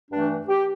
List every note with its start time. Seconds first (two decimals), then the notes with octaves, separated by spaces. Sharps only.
0.11 G2 E3 A3 D4
0.47 G4